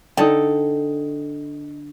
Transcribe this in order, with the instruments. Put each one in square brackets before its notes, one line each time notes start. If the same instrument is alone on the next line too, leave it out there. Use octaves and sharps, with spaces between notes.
[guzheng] D3 [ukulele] D#4 A4 G5